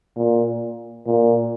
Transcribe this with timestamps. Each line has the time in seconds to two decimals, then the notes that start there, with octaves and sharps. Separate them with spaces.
0.16 A#2
1.07 A#2